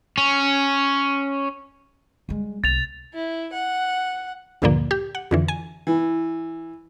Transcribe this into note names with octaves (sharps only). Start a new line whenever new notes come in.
C#4
G3 G#3
B1 A6 F7
E4
F#5
D2 G2 A#2 D3 F3 A#3
G4
F#5
F2 D3 E3
G#5
E3